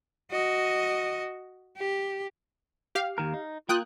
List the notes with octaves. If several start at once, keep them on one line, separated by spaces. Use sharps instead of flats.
F#4 D#5
G4
G4 F5
D#2 D#3 A#4
D#4
A#3 F4 G5 D#6 F#6